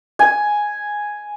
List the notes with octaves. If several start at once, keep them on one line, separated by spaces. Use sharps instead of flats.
G#5